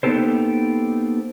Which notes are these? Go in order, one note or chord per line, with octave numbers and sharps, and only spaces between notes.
A#3 B3 D#4 G4 A4 C5